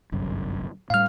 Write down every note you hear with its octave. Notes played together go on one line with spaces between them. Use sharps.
G1 C2 F#2
A2 G3 F5 F6